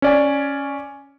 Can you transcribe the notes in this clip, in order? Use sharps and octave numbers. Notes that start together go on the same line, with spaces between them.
C#4 D5 G#5